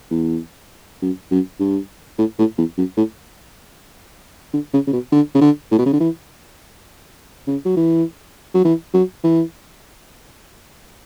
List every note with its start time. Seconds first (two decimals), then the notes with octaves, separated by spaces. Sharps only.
0.10 E2
1.02 F#2
1.31 F#2
1.60 G2
2.18 A2
2.39 A2
2.58 E2
2.77 F#2
2.97 A2
4.53 D3
4.73 C#3
4.87 C#3
4.93 B2
5.12 D3
5.35 C#3
5.41 D3
5.71 A2
5.78 B2
5.86 C#3
5.93 D3
6.00 E3
7.47 C#3
7.65 F#3
7.76 E3
8.54 F#3
8.64 E3
8.94 F#3
9.23 E3